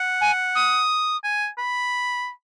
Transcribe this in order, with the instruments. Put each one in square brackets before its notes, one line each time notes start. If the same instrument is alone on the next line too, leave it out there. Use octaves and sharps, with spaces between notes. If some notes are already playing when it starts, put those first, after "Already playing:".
Already playing: [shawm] F#5
[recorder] G#5
D#6
[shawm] G#5
B5